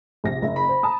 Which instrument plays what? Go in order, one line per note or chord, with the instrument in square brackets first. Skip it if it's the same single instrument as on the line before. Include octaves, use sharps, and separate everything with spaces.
[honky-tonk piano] A#1 C3 A#6
F#1 E5
[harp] B5
[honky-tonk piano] C5
A5 A#5 D#6